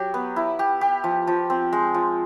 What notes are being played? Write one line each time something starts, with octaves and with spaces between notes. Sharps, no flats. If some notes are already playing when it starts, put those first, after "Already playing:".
Already playing: F#3 G4
B3
E4
G4
G4
F3
F3
C4
G#3
F3